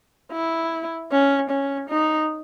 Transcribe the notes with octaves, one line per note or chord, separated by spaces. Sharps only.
E4
C#4
C#4
D#4